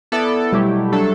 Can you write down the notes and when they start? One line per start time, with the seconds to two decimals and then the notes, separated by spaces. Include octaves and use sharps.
0.12 B3 E4 A4 D5
0.52 B2 F#3 G3 A3 E4 G4
0.92 F#3 A3 D4 A4